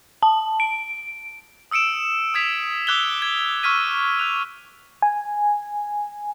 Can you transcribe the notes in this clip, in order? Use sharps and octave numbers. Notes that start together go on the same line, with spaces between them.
A5
D7
D#6 E6 C#7 D7 E7
D#6 E6 G#6 B6 F7
D6 E6 F#6 G#6 F7 G7
G#6
C#6 E6 F6 G#6 B6 D#7
F#6 F7
G#5